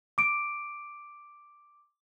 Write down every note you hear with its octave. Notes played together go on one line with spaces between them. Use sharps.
D6 D7